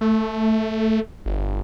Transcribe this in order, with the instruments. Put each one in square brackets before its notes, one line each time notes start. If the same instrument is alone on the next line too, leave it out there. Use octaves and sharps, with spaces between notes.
[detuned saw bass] A3
G1